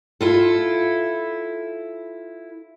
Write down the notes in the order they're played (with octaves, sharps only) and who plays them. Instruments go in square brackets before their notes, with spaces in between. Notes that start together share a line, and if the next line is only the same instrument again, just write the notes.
[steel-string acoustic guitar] E4 F4 A4